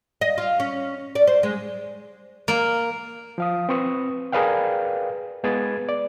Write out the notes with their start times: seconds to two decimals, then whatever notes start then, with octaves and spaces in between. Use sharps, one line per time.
0.21 D#5
0.38 F4
0.60 C#4
1.15 D5
1.27 C5
1.43 G#3
2.48 A#3
3.38 F3 F5 D#6
3.69 C4 B4 C#6 D#6
4.32 G#4 A#4 B4 D5 F5 G5
5.44 G#3 B3 G#4 B4 G#6 A6
5.89 D5